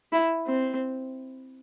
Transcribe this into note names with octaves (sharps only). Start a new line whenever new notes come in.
E4
C4